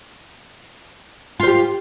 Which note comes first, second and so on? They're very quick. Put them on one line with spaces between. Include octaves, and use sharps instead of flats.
F4 C5 G4